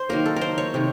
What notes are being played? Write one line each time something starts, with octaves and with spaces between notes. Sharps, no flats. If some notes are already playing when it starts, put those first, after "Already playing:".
Already playing: C5
D#3 F#3 A#3 A#4
A4
A#4
C5
C#5
C3 D#3 A3